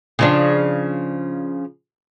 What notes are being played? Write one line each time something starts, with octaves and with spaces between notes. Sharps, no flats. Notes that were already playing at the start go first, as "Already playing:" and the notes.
C#3 F3 D4